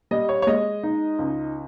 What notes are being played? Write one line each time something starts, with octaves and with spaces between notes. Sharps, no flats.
G3 D#5
C#5
C#5
G#3 D#5
D#4
C#2